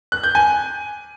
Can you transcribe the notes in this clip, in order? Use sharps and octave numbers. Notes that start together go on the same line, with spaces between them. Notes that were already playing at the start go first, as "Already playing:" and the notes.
F#6
G6
G#5